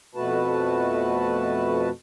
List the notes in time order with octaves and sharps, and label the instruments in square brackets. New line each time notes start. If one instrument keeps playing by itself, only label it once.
[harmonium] F2 B2 A3 F#4 B4 A5